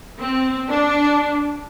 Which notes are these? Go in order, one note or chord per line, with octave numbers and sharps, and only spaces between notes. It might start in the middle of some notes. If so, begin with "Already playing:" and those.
C4
D4